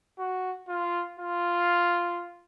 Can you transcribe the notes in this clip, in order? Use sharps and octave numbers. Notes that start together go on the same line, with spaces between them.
F#4
F4
F4